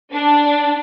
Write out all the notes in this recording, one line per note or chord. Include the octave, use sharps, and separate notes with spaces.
D4